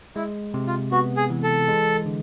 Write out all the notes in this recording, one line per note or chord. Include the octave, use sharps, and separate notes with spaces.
G#3 E4
C3
F4
B3 F#4
G#4
E3
A4
G#3
D3